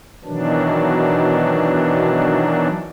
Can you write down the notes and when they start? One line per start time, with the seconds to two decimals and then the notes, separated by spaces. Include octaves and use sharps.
0.25 B2 D#3 E3 F#3 D4